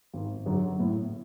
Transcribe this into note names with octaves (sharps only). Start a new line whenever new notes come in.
G#1
F#2 D3 F#3
A2